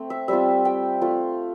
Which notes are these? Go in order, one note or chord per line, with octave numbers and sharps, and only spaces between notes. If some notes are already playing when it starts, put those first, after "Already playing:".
Already playing: A3 C4 G5
E5
G3 C4 F4 E5
G5
A3 C4 F4